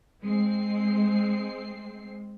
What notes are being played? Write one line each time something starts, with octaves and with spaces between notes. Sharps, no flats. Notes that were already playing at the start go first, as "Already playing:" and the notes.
G#3 C4 C7